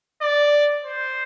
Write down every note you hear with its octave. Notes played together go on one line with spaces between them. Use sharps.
D5
C5